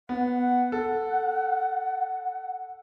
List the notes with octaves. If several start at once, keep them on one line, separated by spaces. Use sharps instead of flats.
B3 F#5
A4